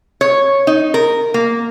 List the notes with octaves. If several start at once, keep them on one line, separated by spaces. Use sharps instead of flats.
C#5
D#4
A#4
A#3